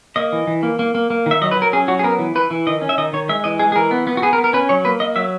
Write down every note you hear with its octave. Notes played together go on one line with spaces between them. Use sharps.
A#3 D#5
E3
E3
A#3
A#3
A#3
A#3
D#3 E5
F#3 D#5
B4
F#3
A#4
C#4 G#4
F#3 F#4
G#4
B3 A#4
E3
E3 B4
E3
D#3 D#5
C#4
E5
D#3 D#5
D#3 C#5
G#3 E5
E3 D#5
G#3 G#4
G#4
E3 A#4
B3
B3
F#4
B3 G#4
A#4
B3
A#4
C#4 B4
F#3 C#5
A#3 B4
A#3 D#5
F#3 E5